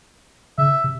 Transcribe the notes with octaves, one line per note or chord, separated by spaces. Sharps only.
C#3 E5
C3